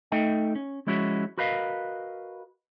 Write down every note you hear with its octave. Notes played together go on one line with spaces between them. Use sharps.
A3 D#4 A4 D#5 E5 G5
C#4
F3 G#3 C#4 E4 F#4
F#4 A#4 B4 D#5 F5